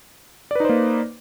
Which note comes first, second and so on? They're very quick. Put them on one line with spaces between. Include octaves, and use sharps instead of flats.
D5 B4 D#4 C5 A#3